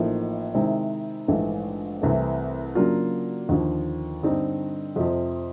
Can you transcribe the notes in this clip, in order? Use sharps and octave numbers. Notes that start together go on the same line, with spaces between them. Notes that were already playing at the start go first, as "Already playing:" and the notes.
Already playing: A1 A2 F3 A#3 D#4
C3 D#3 G#3 C4 E4
A#1 G#2 E3 A3
C2 C3 E3 A3
C#3 F#3 A#3 D4 F4
D#2 D3 F3
G2 D3 G3 C4 D#4
F2 C3 F3